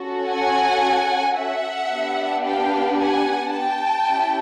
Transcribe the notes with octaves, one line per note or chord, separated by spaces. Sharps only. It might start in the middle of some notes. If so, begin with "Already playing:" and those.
Already playing: C#4 F#4 A4
F#5 G#5
E5 F#5
B3 D4 G4
F5 G5
F#5 G#5
G5 A5
C#4 E4 G4